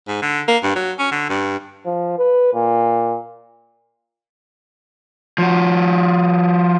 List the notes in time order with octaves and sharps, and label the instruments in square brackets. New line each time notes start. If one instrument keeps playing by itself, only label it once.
[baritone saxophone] G#2
D3
A#3
G2
F#3
C#4
D3
G2
[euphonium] F3
B4
A#2
[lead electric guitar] F3 F#4